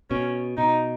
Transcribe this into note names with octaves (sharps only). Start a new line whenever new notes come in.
B2 C#4
B2 D#4